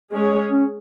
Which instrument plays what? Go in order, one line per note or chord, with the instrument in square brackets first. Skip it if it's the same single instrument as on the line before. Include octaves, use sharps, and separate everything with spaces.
[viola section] G#3 C#4 G#4 C#5
[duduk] C#4